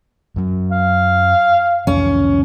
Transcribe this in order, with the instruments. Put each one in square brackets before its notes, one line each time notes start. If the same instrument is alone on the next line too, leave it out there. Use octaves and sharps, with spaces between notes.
[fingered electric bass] F#2 F#3
[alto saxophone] F5
[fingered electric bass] C2 F2 E3 [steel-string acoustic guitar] C#4